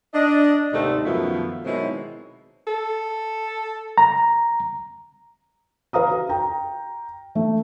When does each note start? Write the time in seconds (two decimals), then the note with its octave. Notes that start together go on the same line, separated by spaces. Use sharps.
0.13 D4 D#5
0.73 D#2 G#2 C3 A3 D4 D#4
1.05 F#2 B2 D#3 F3 A3 B3
1.65 B2 D#3 F#3 G#3 C4 E4
2.67 A4
3.98 A#5
5.93 B4 F5 A#5 D#6
6.10 F#4
6.29 G5 A#5
7.35 A3